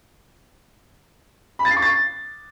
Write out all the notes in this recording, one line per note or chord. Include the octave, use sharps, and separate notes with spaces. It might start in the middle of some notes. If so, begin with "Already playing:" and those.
B5
A6
C7
C#6
A6